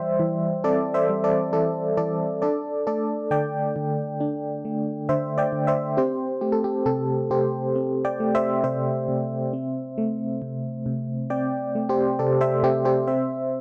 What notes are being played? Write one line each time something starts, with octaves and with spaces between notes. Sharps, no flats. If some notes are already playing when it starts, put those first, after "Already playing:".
Already playing: E3 G3 C5 D5 E5 G5
E3
C4 A4 D5
C5 E5
G3
A4 D5
E3 A4 D5
E3 A4 D5
D4 A4 D5
A3 A4 D5
D3 D5 G5
D3
D4
A3
D3 C5 E5
D5 G5
D3
C5 E5
C4 G4 C5
A3 G4
A4
G4
C3 A4
C3 G4 C5
C4
D5 G5
A3
C5 E5
C3 C5 E5
C3
C4
A3
C3
C3
C4 D5 G5
A3
G4 C5
C3 A4 D5
C5 E5
C3 G4 C5
G4 C5
C4 C5 E5